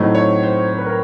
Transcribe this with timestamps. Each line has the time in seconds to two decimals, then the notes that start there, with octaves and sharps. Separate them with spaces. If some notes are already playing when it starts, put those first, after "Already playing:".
Already playing: A2 F#3 A3 C4 D#4
0.15 C#5
0.43 C5
0.71 C5
0.78 B4
0.86 A#4